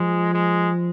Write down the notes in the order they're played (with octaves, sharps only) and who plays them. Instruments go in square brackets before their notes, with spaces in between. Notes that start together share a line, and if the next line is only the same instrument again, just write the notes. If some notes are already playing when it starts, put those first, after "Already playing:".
Already playing: [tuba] F3 [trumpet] G#3
[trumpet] G#3